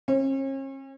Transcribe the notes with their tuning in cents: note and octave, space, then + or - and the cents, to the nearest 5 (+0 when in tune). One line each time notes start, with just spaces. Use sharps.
C#4 -40